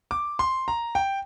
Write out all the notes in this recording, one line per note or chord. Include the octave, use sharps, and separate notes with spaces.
D6
C6
A#5
G5